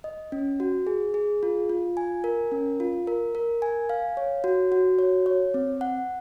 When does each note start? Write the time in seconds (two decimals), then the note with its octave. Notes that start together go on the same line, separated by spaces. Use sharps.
0.04 D#5
0.32 C#4
0.60 F#4
0.87 G#4
1.14 G#4
1.43 F4
1.69 F4
1.97 G#5
2.24 A#4
2.52 C#4
2.80 F4
3.07 A#4
3.35 A#4
3.62 G#5
3.90 F5
4.17 C#5
4.44 F#4
4.72 F#4
4.99 C#5
5.26 C#5
5.54 C4
5.81 F#5